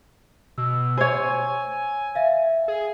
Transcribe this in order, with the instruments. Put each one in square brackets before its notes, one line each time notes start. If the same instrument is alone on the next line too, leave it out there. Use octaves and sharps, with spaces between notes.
[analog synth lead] B2 [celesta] E6
[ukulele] C5 C#5 [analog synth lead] G#5
[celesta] E5 F5
[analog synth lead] G#4